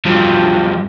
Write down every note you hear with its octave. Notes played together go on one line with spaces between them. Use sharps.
G2 F3